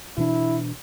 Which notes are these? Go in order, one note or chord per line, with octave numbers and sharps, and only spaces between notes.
B2 E3 D4 E4